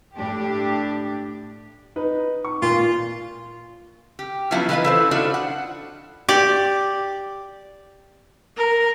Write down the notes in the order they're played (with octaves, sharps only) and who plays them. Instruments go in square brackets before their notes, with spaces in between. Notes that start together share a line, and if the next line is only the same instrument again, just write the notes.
[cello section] A2 D4 G4
[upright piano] D#4 B4
C#6
[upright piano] A#2 [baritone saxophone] F4
[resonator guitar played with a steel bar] G4
F3 F#3 B3 C#4 E4 F4
E3 F4 B4 D#5 F5 G#5
E4 A4 C5
D4 D#4 F4 F#4 A4
F#5
[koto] G4 D5
[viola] A#4